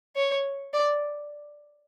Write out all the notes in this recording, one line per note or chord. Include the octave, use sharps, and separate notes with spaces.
C#5
D5